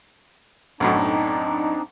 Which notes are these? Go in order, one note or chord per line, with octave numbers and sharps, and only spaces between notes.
B1 F#2 A2 C4 D4 D#4